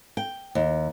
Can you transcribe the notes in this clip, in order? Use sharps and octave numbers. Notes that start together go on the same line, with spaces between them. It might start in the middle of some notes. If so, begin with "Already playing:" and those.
G5
D#2